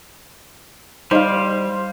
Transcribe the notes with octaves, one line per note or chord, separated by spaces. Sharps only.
G3 D#4 C5 D#5 F5